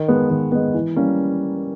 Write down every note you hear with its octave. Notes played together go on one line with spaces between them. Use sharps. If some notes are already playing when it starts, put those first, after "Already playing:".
Already playing: D#3
G#3 B3
D#3
G#3 B3
E3
G3 A#3 C#4